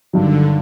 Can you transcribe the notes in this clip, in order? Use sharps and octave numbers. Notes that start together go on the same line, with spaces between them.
G2 D3 D#3 F#3